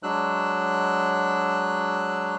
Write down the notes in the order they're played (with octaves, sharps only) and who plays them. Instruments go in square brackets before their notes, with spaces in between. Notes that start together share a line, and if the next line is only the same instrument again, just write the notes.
[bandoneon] F#3 G#3 D4 E6 F#6